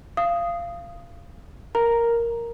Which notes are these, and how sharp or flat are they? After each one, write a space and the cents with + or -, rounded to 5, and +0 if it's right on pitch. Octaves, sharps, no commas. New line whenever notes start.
F5 -20 D#6 +0
A#4 +0 A#5 +0